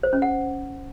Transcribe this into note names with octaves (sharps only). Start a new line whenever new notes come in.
C5
C#4
F#5